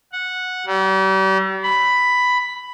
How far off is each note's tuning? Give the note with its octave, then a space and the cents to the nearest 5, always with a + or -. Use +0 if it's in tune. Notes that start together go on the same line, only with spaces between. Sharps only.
F#5 -10
G3 -40
B5 +5